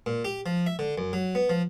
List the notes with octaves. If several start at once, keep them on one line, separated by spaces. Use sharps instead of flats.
A#2
G4
F3
E5
D3
F#2
F#3
B3
F3